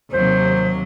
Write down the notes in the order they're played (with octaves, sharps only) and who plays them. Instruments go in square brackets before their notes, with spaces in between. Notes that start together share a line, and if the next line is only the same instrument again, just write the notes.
[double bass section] D#2 C3 [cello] F#3 [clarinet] C5